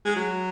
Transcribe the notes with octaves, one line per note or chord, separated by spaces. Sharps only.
G#3
F#3